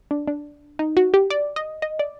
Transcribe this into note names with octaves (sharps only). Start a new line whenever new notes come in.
D4
D4
D#4
F#4
G4
D5
D#5
D#5
D5